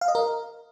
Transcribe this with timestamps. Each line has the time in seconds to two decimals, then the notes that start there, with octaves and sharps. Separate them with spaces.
0.01 F5
0.08 D#5
0.15 A#4